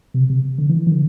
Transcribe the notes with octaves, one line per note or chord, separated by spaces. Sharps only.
C3
C3
D3
E3
E3
D3